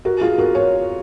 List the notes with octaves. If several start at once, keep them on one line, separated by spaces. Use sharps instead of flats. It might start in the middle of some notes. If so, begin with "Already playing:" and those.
F#4 A#4
F4 G#4
F#4 A#4
A#4 C#5